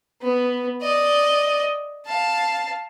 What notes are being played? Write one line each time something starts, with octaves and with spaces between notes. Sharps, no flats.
B3
D5 D#5
F5 A5